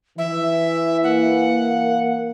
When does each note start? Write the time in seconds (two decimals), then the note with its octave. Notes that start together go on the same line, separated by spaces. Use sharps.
0.18 E3 E5
1.04 A#3 F#5